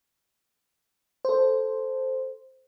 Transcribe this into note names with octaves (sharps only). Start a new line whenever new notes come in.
A4 C5